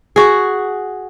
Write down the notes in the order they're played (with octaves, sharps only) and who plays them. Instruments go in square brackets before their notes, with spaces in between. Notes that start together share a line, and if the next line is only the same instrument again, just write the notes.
[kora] F#4 G#4